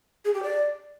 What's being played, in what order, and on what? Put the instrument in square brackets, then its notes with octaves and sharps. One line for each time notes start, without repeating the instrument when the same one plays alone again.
[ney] G#4
G4
D5